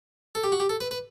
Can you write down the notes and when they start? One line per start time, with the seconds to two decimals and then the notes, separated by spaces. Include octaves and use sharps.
0.35 A4
0.44 G4
0.52 F#4
0.60 G4
0.69 A4
0.81 B4
0.91 B4